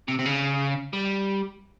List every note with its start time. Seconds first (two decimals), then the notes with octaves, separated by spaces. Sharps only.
0.08 C3
0.19 C3
0.26 C#3
0.93 G3